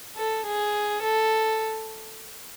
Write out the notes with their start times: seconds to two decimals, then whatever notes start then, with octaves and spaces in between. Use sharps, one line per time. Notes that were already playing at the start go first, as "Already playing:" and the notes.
0.16 A4
0.46 G#4
1.03 A4